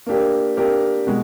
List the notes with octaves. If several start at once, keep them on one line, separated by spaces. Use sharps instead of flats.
A#3 D4 G4 A#4
A#3 D4 G4 A#4
B2 G#3